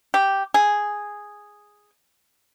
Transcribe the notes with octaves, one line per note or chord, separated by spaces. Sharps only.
G4
G#4